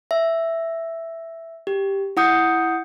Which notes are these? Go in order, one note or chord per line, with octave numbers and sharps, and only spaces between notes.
E5
G4
E4 F#5 D#6 G6 C#7